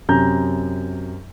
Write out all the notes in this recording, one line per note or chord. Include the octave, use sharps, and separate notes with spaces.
F#2 C3 A#5 G6